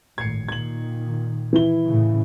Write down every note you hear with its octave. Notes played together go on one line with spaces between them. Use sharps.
G#1 A2 G#6 C7 C#7
A#2 D#3 G#6 F#7
E3 E4 G7
A2 C#3